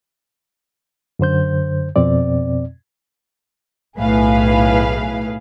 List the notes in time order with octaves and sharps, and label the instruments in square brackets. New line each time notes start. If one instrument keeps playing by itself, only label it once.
[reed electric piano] F#2 D3 C5 G6
F2 B2 C4 D5
[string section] B1 A2 G#4 B4 F5